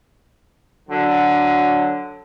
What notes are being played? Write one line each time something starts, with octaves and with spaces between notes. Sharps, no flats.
D3 F#3